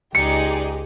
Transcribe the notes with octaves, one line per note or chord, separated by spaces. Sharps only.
C#2 G#3 D#4 G4 G#4 D5 C#7